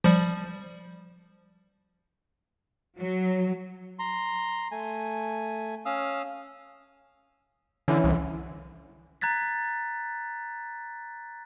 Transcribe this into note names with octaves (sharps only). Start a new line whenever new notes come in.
F3 G3
F#3
A#5 C6
A3 G#5
C#4 F5 D#6 E6
D3 E3 C#4 E4
C2 E3
A#5 F#6 G#6 A6 B6